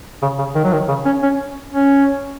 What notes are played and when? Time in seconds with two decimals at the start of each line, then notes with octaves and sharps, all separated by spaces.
0.22 C#3
0.38 C#3
0.55 D#3
0.64 F#3
0.73 D#3
0.89 C#3
1.06 C#4
1.23 C#4
1.74 C#4